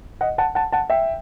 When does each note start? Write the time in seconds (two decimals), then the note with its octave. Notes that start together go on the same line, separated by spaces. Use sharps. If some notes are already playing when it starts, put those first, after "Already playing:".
0.21 D#5 F#5
0.38 F#5 A5
0.55 F#5 A5
0.72 F#5 A5
0.90 E5 G5